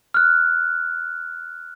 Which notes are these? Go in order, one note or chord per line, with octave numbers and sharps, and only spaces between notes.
F6 F#6